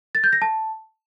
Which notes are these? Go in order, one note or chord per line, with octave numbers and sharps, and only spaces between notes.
A6
G6
A#6
A5